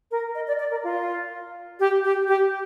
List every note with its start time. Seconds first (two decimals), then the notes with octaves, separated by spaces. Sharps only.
0.11 A#4
0.35 D#5
0.48 D5
0.60 D5
0.71 A#4
0.84 F4
1.80 G4
2.04 G4
2.28 G4